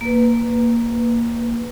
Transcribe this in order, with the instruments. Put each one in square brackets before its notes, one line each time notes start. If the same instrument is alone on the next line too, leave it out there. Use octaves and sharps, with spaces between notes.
[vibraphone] A#3 B4